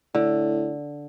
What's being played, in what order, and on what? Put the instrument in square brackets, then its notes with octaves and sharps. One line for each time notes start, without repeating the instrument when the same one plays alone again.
[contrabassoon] A2 [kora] D3